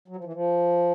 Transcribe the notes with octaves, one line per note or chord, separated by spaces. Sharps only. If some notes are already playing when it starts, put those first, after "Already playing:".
F#3
F3
E3
F3